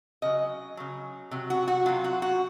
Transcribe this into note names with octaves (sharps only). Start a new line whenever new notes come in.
C#3 F#3 D#5
C#3 F#3
C3 F#3
F#4
F#4
C3 F#3 F4
F#4
F#4